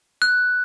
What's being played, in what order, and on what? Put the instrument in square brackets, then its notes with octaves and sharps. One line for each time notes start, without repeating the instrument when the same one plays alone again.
[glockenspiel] F#6